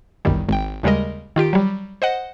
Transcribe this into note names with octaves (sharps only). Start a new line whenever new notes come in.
G1 C2 F#2 D#3 G3
G#1 G5
D#2 C#3 G3 G#3 A#4 D#5
D#3 F4 G4 D7
F#3 G3
C5 D#5 F#5